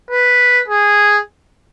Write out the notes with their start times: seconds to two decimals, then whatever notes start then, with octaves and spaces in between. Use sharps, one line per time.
0.11 B4
0.68 G#4